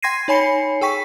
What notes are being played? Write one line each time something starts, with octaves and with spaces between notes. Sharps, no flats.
G5 C6 G#6 A#6 C7 D#7
D#4 C#5 G#5 B5 C7 C#7
G#4 G5 C#6 B6